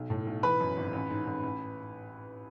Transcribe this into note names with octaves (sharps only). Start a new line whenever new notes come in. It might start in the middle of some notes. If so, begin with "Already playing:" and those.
Already playing: B1
A2
B1
E3 B4 B5
F#2
G#1
A1
G#2
A1
A1